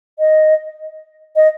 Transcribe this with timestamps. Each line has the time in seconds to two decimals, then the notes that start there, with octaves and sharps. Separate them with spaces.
0.19 D#5
1.36 D#5